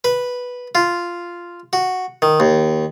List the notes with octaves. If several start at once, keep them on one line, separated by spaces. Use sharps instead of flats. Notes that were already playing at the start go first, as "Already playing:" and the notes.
B4
F4
F#4
D#3
D#2